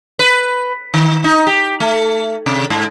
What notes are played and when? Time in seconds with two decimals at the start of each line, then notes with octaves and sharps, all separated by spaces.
0.19 B4
0.94 D#3
1.24 D#4
1.47 G4
1.80 A3
2.46 C3
2.70 G#2